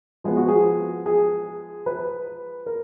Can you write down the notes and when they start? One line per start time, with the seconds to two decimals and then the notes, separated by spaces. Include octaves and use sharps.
0.24 F3 G#3 B3 G#4
0.37 F#4
0.48 G#4
1.06 G#4
1.86 B4
2.66 A#4